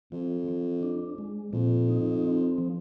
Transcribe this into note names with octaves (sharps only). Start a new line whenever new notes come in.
F2 F3
F3
D4
G#3
F2 A#2
D#4
C4
F3